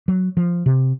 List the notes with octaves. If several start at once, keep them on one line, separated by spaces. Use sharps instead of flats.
F#3
F3
C3